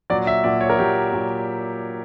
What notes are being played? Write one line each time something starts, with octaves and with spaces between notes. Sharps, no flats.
A#2 F#3 D5
E5
A#2 F#3 D5
C#5
A#4
A#2 F#3 G4
A#2 F#3